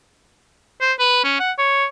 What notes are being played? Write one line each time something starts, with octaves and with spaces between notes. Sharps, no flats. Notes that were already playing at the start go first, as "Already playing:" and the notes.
C5
B4
C#4
F#5
C#5